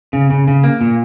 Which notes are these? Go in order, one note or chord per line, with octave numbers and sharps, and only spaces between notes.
C#3
C#3
C#3
A#3
A#2